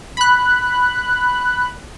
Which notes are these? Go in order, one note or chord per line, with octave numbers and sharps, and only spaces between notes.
B5 F#6